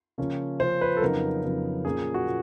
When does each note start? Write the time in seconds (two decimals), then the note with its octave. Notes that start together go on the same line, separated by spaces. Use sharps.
0.18 C#3 F3 A#3 C#4
0.60 C#3 F3 A#3 C#4 C5
0.81 B4
0.97 A4
1.02 F2 C#3 F#3 B3 D#4 A#4
1.43 F2 C#3 F#3 B3 D#4
1.85 A#2 F3 A#3 C#4 G#4
2.14 F#4
2.27 A#2